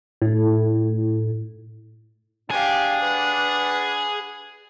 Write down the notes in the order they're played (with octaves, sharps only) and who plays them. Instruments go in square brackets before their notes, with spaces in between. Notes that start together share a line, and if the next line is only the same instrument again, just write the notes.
[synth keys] A2
[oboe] D4 [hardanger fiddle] G4 F5 [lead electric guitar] G#4 G#5
[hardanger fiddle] B4 F#5